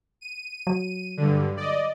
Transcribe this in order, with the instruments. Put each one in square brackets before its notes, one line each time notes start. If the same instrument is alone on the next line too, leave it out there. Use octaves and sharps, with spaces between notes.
[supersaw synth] D#7
[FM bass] F#3
[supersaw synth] G2 D3
D5 D#5